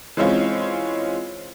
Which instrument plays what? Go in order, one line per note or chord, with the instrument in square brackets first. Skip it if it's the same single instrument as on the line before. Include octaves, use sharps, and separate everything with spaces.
[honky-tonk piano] E3 G#3 C4 C#4 F4